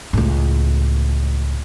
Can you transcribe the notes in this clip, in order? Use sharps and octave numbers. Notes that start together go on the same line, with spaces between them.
C#2 A2